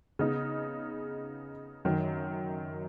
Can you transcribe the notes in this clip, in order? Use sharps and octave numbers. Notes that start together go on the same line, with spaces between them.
C#3 B3 D#4
F#2 D#3 F#3